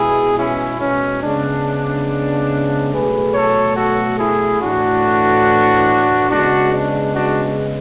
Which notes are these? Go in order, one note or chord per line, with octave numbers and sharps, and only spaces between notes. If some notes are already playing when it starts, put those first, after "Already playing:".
Already playing: B2 G#3 B3 E4 G#4
C#4 E4
C#4
C#3 G#3 B3 D4
B2 F#3 A3 G#4 B4
A4 C#5
F#4 A4
E4 G#4
A2 E3 A3 D4 F#4
C#3 G#3 B3 D4 F#4
D4
D4 F#4